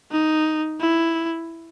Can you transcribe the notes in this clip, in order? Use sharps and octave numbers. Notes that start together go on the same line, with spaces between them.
D#4
E4